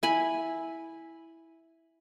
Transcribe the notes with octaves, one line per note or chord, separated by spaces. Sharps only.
E4 G#5 B5